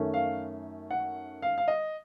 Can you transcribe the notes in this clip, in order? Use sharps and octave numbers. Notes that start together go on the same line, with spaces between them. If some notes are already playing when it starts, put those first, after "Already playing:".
Already playing: F#2 D#3 A3 C#4
F5
F#5
F5
F5
D#5